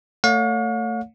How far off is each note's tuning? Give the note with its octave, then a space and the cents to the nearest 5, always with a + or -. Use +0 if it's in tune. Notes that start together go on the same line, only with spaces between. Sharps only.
A3 +25 C#5 +25 F5 +45